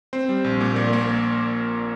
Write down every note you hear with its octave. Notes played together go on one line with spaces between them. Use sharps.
C4 C5
G3
A#1
A#2
A#1 A#4 D5
A#3 A#4